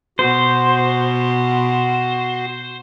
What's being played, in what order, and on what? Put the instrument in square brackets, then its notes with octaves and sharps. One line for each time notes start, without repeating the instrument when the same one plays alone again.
[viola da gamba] B2 [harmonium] F#4 [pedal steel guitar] C5